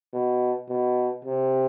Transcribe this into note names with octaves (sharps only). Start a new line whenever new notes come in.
B2
B2
C3